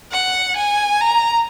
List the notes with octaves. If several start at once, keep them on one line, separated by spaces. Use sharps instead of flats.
F#5
G#5
A#5